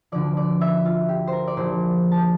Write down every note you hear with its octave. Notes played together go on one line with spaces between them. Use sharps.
D2 D3 F3 D5
D5
E5
F4
G4
A#4 C5
D5
A#1 A#2 F3 C5
A5